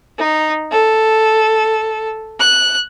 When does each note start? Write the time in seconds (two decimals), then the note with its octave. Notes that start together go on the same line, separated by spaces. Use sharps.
0.17 D#4
0.72 A4
2.40 F#6